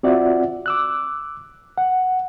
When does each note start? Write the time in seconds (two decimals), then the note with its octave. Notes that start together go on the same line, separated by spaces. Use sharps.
0.03 C4 F4 F#4 D5 E5 F#5
0.66 D6 E6 F#6
1.78 F#5